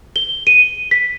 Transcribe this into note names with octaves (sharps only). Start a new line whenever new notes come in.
G7
D#7
B6